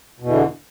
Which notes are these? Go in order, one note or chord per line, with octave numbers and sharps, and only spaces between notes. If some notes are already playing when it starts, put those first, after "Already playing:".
E2 B2 D3 E3